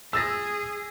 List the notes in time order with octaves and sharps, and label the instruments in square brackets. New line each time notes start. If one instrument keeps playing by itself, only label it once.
[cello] G#4 [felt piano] E6 A6 A#6